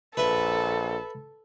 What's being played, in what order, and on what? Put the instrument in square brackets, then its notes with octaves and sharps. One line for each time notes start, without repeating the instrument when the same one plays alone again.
[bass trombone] A#1 [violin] A4 [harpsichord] B4 E5